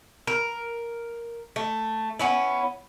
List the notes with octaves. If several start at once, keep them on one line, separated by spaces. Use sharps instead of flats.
A#4
A3
B3 C#4 E4